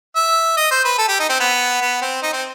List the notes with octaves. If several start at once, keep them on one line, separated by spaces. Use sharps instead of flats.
E5
D#5
C5
B4
A4
G4
D#4
C4
B3
B3
C4
D#4
C4